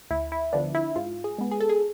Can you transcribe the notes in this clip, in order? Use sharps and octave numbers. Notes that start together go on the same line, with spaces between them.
D2 E4
E4
D3 F3 B3 D4
E4
G#2 F4
G#4
G#3 B3
G#4
A4
G#4